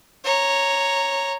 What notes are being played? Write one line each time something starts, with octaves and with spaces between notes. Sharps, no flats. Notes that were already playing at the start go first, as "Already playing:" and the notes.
C#5 A#5